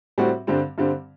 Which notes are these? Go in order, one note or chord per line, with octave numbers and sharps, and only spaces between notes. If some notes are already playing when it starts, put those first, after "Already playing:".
A2 G3 C4 F#4
G2 D3 G3 C4
G2 D3 G3 C4